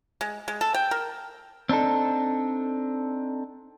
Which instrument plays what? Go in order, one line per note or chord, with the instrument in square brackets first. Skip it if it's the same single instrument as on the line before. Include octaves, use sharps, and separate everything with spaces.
[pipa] G#3
G#3
A4
G5
A#4
[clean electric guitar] C4 D4 D#4 A4